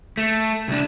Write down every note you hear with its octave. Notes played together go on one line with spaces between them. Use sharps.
A3
C2 D4